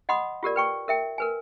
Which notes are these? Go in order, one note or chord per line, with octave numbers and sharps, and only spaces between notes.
D#5 F#5 B5 C6 D#6
F4 G4 A#4 D5
B4 G5 C#6
A#4 E5 G5
A#4 B4 G#5